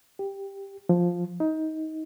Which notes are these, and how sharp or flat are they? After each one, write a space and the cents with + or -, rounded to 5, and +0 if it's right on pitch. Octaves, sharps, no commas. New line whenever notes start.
G4 +5
F3 +5
D#4 +20